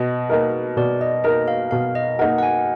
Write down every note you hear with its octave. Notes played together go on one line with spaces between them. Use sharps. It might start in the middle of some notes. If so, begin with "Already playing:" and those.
Already playing: B2 D#5
A#3 D#4 A#4
B2 D5
D#5
A#3 D#4 A#4 D#5
F5
B2 F5
D#5
A#3 D#4 A#4 F#5
F#5
G#5